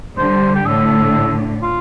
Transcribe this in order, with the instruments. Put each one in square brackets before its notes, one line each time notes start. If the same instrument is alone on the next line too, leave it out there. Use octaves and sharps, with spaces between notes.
[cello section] D3 G3 [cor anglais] C5
[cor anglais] G4
[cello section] A2 D3 [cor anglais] A4
[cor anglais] F4